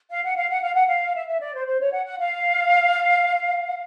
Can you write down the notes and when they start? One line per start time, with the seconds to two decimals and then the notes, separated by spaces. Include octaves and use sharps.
0.10 F5
0.23 F#5
0.35 F5
0.49 F#5
0.62 F5
0.74 F#5
0.87 F5
1.15 E5
1.27 E5
1.40 D5
1.54 C5
1.66 C5
1.80 C#5
1.93 F#5
2.05 F#5
2.18 F5